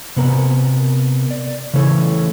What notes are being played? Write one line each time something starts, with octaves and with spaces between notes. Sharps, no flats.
C3 B3 A#4
D5
C#3 E3 A3 C#5